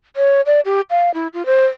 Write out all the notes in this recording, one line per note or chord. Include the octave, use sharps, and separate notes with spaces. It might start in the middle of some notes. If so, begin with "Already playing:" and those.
C#5
D5
G4
F5
E4
F4
C5